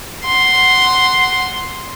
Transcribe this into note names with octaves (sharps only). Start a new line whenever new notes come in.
F#5 C6